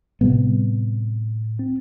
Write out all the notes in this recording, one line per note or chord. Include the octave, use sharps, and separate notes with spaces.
A2 C3 G3 B3
C4